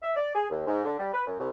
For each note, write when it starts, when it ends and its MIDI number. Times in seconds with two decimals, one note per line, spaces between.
0.02 0.11 76
0.16 0.33 74
0.34 0.44 68
0.49 0.65 39
0.66 0.84 44
0.85 0.95 50
0.98 1.11 55
1.13 1.21 71
1.26 1.37 42
1.39 1.48 36